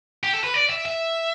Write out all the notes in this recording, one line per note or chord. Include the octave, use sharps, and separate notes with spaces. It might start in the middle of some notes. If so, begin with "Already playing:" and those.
G4
A4
B4
D5
E5
E5